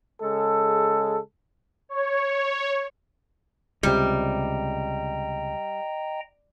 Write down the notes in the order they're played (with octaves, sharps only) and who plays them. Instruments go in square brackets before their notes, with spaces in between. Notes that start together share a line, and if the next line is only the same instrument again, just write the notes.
[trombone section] C#3 G#3 A4
[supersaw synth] C#5
[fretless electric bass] C#2 C3 [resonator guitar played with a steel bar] G3 [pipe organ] D#5 G5 A#5